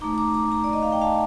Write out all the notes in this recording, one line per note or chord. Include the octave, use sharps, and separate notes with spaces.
A3 D#4 A#5 D6
A#5 D6
A#5 D6
A#5 D6
D5
D#5
F5
G5
F5 A5